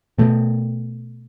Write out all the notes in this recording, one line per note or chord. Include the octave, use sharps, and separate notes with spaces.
B2 A3